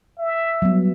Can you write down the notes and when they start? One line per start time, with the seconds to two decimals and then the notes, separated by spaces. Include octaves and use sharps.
0.19 E5
0.62 F#3 G3 B3